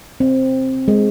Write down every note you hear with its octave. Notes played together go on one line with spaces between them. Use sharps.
C4
G#3